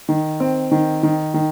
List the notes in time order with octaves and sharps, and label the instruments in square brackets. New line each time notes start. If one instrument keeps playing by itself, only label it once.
[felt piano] D#3
C4
D#3
D#3
D#3